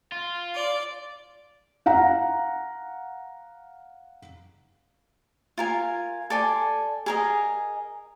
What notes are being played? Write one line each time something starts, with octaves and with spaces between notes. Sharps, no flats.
F4
D5
F5 F#5 A#5
F4 A#4 G#5
A4 D5 G#5 C6
G#4 A#4 D#5